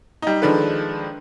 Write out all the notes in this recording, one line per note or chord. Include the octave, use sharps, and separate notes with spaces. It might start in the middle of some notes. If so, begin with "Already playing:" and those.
G3 D#4
D#3 F3 G#3 D4 A4 B4